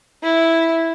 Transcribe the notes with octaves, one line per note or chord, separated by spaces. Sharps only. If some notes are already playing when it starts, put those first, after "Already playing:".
E4